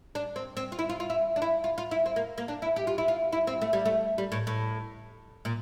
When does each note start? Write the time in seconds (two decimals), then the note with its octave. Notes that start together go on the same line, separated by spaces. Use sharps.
0.15 D4
0.36 C4
0.57 C4
0.72 F4
0.79 E4
0.89 F4
1.00 F4
1.10 E4
1.36 D4
1.42 E4
1.64 F4
1.78 F4
1.91 E4
2.06 C4
2.16 A#3
2.38 A#3
2.48 D4
2.62 E4
2.76 G4
2.87 F4
2.98 E4
3.08 F4
3.33 E4
3.47 C4
3.62 A3
3.73 G3
3.85 A3
4.18 G3
4.32 A2
4.47 A2
5.45 A#2